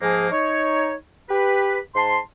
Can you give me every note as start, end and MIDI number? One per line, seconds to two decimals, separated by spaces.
0.02 0.28 44
0.02 0.28 53
0.02 0.28 58
0.02 0.28 63
0.02 0.28 68
0.32 0.96 63
0.32 0.96 73
1.30 1.79 67
1.30 1.79 71
1.96 2.19 44
1.96 2.19 81
1.96 2.19 84